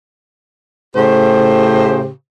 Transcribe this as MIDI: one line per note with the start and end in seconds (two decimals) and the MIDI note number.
0.96 2.09 45
0.96 2.09 49
0.96 2.09 67
0.96 2.09 72